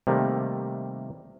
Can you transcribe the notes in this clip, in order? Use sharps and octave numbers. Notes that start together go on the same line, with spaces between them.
C3 D#3 G3 A3 A#3